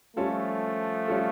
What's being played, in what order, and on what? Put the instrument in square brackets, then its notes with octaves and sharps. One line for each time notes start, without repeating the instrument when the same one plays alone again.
[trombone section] F3 A3 [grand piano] G3 C#4 F4 A4
[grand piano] G3 C#4 F4 A4